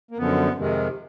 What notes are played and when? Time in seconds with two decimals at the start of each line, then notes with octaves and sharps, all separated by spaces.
0.11 A#3
0.18 F#2 D3 F3 B3
0.57 F2 C3 D#3 G#3